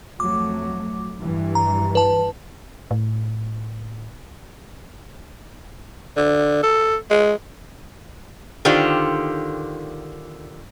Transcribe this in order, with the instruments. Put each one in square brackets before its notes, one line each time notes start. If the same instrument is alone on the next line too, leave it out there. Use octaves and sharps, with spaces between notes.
[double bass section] F2 F#3 A3 [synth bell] D6
[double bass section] G2 E3 G3
[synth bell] A#5
B4 A5
[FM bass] A2
[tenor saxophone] D3
A4
G#3
[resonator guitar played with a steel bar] D3 D#3 F4 G4 C5